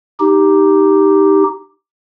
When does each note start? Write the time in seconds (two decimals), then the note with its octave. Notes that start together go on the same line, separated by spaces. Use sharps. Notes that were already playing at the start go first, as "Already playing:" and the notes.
0.20 D#4 G4